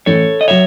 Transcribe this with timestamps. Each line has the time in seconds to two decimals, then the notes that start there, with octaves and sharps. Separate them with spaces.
0.06 A1 A4 C#5
0.41 D#5
0.48 F#3 C#5 E5